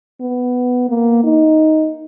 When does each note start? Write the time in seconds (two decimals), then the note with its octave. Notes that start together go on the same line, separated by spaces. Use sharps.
0.21 B3
0.89 A#3
1.24 D#4